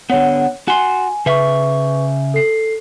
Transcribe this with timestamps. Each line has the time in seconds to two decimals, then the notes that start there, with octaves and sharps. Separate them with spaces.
0.10 D3 B3 C#5 F#5
0.68 F#4 G#5 C6
1.26 C#3 B4 E5 C#6
2.34 A4 C7